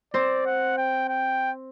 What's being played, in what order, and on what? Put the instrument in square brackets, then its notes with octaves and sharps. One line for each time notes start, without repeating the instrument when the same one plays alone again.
[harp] C4 C5 [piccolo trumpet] D5
[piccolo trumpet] F#5
G5
G5